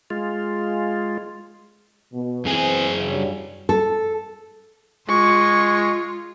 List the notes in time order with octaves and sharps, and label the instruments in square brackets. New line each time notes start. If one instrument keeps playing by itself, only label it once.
[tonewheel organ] G#3 F4
[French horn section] B2
[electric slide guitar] F#2 G#4 G#5 [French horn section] E3 C4
[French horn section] G2 F#3 G3
[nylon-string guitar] A4
[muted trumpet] G#3 [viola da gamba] F4 [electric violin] C#6